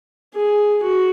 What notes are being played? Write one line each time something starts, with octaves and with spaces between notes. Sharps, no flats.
G#4
F#4